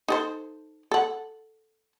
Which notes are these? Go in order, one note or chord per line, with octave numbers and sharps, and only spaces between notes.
D#4 A4 C5
A4 F#5